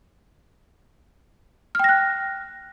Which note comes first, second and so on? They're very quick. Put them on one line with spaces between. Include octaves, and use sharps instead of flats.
F6 G5 A#6 F#6